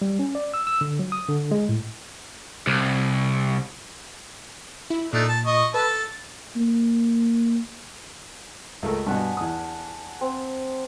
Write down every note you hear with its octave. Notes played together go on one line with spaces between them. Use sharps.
G3
C#4
D5
E6
E6
D3
F#3
D#6
D3
G#3
A2
C2
E4
A#2 A3 D4 D#4
A5
D#5 C#6
A4 B4 A5
A6
A#3
C#2 A3 A#4
G2 B2 D4 F#5 G#5
E2 D#6
C4